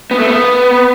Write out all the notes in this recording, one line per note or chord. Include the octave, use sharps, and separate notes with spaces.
B3
A3
B3